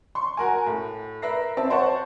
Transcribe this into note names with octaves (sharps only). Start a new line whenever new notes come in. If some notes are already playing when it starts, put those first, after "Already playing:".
C6 C#6
F#4 A#4 G#5
A2
A#4 B4 E5 A#6 C7
C4 E5 A5
C5 C#5 F#5 A5 C#6